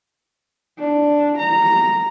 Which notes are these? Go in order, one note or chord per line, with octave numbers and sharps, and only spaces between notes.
D4
A#5